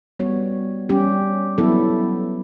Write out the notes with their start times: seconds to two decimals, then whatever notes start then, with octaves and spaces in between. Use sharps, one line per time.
0.20 G3 B3 F#4 C#5
0.89 G3 C#4 G4
1.58 F#3 B3 E4 A4